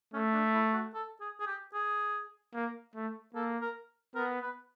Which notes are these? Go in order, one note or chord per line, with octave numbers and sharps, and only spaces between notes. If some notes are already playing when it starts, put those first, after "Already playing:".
A3 C#4
D4
E4
F#4
A4
G#4
G#4
G4
G#4
A#3
A3
A#3 A4
A#4
B3 A#4
B4